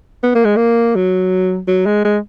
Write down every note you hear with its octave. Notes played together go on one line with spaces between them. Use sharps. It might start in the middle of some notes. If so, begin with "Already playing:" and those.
B3
A#3
G#3
A#3
F#3
F#3
G#3
G#3